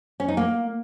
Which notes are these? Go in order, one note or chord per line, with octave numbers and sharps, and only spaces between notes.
C#4
D#4
A#3